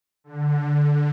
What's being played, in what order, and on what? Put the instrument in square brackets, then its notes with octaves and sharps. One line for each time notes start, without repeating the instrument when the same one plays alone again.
[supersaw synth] D3